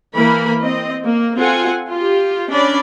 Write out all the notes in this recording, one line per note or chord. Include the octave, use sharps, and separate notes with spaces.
E3 A#3 A#4 B5
C4 D#5
A#3
C4 F4 A4 F#5 G#5
F4 G4
C#4 D4 D5 B5